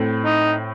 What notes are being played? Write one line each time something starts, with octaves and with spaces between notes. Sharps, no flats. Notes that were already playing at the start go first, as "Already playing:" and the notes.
Already playing: A2 A3 C4
D#4